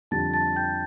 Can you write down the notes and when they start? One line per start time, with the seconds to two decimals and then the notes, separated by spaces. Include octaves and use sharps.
0.11 F2 D3 G3 A5 A6
0.34 A5 A6
0.56 G5 G6